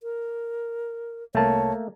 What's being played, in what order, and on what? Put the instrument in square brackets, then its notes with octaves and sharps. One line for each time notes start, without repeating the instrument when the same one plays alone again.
[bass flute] A#4
[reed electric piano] C2 A5 [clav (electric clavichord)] A3 A#3 [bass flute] C#5